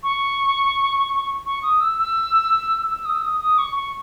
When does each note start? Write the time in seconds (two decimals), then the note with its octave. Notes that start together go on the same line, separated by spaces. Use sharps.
0.03 C#6
1.46 C#6
1.63 D#6
1.80 E6
1.98 E6
2.87 E6
3.05 D#6
3.13 E6
3.22 D#6
3.40 D#6
3.58 C#6
3.76 C#6